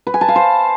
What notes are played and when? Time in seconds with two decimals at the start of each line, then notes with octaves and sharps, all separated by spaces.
0.07 B4
0.14 G#5
0.21 A5
0.28 F5
0.36 C5